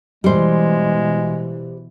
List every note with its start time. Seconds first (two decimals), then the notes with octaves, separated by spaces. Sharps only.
0.24 B2 E3 G3 G#3 C5